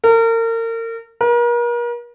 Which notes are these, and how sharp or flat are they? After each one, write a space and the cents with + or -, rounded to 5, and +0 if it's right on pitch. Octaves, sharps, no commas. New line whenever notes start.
A#4 -35
A#4 +40